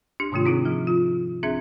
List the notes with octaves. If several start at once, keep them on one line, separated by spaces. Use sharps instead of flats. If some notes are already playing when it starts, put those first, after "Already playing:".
D4 G4
G#2 C3 D#3 A3 F4
C4 D#4 E4 G#4
F3
F4
C4 D4 G#4 E5 G#6